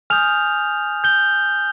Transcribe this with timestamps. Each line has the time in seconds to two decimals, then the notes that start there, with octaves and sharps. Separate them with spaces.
0.10 G#5 D#6 F6 G6 F7
1.04 G6 G7